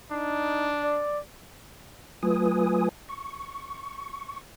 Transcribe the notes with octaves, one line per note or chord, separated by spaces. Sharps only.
D4 D#4
D5
F#3 A3 F4 B4 G#5 D#6
C#6